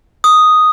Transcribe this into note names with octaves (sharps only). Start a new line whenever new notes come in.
D#6